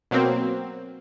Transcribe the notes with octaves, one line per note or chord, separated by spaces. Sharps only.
B2 F#3 A#3 C4